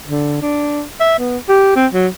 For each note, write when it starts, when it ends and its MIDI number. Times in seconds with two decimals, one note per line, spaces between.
0.08 0.42 50
0.42 0.82 62
1.00 1.18 76
1.19 1.37 59
1.49 1.75 67
1.76 1.87 60
1.94 2.07 54